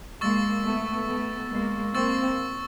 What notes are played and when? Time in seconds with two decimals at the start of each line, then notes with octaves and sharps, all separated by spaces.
0.21 G#3 A#3 C#6 E6 A6
0.64 A3 B3
1.08 A3 B3
1.51 G#3 A#3
1.94 A#3 C4 C#6 E6 A6